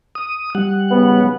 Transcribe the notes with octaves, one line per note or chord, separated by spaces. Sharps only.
D#6
G3 F#5
B1 C#3 B3